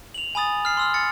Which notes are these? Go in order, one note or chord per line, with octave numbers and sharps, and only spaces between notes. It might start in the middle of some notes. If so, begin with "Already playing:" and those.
F7 F#7
G#5 B5 D#6 A6
F6 C7
C6 E6 F6
A6 C#7